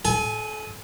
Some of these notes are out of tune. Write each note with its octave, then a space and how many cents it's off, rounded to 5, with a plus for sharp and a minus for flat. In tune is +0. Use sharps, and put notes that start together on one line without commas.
A4 -35 G#5 +0